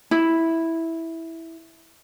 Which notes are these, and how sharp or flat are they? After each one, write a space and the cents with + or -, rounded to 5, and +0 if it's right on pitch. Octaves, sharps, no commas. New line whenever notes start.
E4 -5